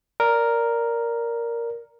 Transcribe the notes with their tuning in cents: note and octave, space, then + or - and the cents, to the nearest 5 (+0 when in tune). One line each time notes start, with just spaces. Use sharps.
A#4 +0 D5 -10